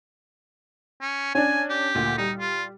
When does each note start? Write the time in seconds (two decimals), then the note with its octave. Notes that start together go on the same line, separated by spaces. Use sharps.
1.01 C#4
1.35 C#4 D4 G#5
1.70 G4
1.95 D2 A#2
2.18 G3 D#4
2.40 F4